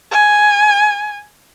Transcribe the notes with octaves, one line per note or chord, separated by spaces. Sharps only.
G#5